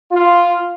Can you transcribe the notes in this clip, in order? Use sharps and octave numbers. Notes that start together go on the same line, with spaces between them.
F4